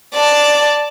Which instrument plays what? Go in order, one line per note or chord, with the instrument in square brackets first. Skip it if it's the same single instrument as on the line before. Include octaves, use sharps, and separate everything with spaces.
[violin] D5 A5